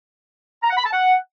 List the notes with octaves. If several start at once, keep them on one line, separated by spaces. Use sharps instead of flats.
A#5
F#5
B5
A5
F#5